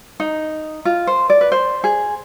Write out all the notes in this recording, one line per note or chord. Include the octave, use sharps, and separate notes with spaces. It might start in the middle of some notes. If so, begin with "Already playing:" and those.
D#4
F4
C5
D5
B4
C5
G#4